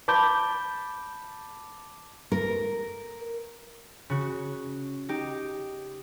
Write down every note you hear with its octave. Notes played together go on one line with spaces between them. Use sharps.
A5 B5 D6 G6
A#4
C#3 F#4
D#4 G4